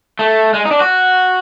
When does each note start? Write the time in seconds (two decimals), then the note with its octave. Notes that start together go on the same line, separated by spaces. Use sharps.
0.19 A3
0.54 G#3
0.65 D#4
0.71 D4
0.80 F#4